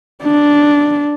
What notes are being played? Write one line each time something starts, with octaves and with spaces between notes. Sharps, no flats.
D4